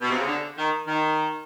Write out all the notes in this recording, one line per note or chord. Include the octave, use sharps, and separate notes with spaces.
B2
C3
C#3
D3
D#3
D#3